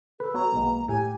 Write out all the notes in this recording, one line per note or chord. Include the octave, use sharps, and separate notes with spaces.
A4 B4
B3 F#4 C#5 A#5
B1 G#3 A#3 B3
A2 G4 G#5